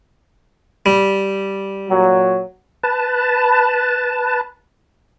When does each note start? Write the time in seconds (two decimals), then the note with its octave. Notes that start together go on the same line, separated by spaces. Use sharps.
0.86 G3
1.89 A#2 F#3
2.83 B4 A5